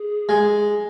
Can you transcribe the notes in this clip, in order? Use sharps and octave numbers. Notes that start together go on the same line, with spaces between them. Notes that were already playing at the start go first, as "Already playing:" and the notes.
Already playing: G#4
G#3